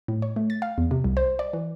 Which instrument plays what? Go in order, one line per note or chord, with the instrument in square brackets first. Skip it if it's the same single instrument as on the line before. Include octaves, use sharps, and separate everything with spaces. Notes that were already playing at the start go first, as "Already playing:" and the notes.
[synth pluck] A2
C#5
A3
A6
F5
E2
C3
C2
C5
D5
E3